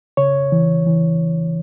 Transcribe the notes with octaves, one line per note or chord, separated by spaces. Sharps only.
C#3 C#5
E3
E3